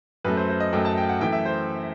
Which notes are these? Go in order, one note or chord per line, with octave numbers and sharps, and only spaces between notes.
F#2 F#3 A3 B4
C5
C5
D#5
F#2 F#3 A3 G5
A5
G5
F#5
F#2 E3 A3 G5
E5
C5